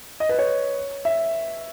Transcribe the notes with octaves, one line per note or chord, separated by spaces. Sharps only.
D#5
B4
C#5
E5